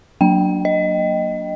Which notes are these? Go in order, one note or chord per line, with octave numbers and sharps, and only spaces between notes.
F#3 A#3 D4 G5
D#5